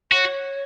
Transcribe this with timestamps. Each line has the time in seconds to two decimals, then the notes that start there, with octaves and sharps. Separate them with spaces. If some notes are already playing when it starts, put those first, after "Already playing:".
0.12 F#4 C#5